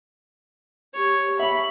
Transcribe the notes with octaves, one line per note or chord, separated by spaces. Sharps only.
G4 C#5
E5 B5 C#6